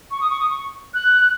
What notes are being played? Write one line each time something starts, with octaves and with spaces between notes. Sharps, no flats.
C#6
D#6
C#6
D#6
C#6
F#6